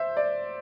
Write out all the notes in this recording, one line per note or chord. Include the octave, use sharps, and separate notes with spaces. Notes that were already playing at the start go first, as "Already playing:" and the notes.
Already playing: C5 E5
D5